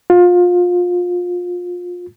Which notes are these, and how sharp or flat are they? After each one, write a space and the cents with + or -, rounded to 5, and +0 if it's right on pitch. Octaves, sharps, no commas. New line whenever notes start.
F4 +25